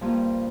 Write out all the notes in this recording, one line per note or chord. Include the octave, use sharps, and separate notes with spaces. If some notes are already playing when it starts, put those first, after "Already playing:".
G2 F3 A#3